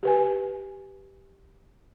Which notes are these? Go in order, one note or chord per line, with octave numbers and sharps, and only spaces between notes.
G4 B4 G#5